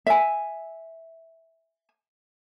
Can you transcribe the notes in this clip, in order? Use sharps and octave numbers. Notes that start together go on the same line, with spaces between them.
E5 G#5